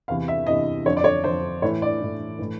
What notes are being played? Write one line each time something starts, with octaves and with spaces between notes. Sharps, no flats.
E2 C3 E3 F5
E5
E2 C3 E3 D#5
F2 D3 C#5
D5
C#5
F2 D3 C5
A2 E3 C#5
D5
A2 E3
A2 E3